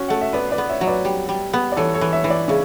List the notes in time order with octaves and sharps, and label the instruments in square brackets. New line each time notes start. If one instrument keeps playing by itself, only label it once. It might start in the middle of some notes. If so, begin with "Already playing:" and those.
Already playing: [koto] C#4 F#4
[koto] A3 [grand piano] F#5
[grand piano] E5
[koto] B3 [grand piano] B4 D5
[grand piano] B4 D5
[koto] B3
[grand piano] C#5 E5
[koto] F#3
[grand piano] B4 D5
[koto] G3
G3
B3
[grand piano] D5
[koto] E3 [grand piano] A4 C#5
[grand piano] A4 C#5
[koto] E3
[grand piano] C#5 E5
[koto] E3
[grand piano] B4 D5
[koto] C#3 [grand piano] C#4 E4